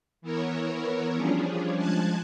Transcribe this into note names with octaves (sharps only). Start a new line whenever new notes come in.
E3 B3 E4 A#4 C#5
F3 G3 C#4 D4 G#4
F3 G#3 A5 F#6 G#6